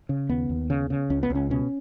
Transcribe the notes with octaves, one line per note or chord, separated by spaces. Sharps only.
C#3
D#2 B3
D#2
C#3
C#3
C#2 C#4
B3
C#2
C#4
B2 C#4